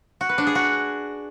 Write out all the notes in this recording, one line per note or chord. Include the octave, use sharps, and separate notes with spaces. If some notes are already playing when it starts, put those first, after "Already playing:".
F#4
B4
D4
G#4
F#4